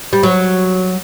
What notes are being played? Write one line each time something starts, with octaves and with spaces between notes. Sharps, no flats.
G3
F#3